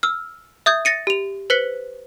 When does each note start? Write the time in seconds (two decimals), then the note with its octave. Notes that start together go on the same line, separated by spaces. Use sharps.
0.03 E6 F6
0.66 E5 D#6 G6 G#6
0.85 A6 A#6 C#7 D#7
1.07 G4 F7
1.50 B4 C5 F#6 B6 C#7